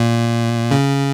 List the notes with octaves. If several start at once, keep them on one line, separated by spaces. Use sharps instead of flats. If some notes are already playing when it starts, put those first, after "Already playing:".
Already playing: A#2
C#3